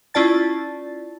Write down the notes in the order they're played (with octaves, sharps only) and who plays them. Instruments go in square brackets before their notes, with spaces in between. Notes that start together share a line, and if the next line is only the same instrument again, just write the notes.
[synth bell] C#4 E4 F4 D5 A5 A6